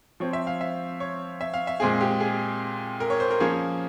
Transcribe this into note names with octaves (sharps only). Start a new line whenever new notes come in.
F3 C4 C#5
E5
F5
E5
C#5
E5
F5
E5
A#2 G#3 C4 G#4
G4
G#4
A#4
C#5
C5
A#4
F3 A#3 C#4 G#4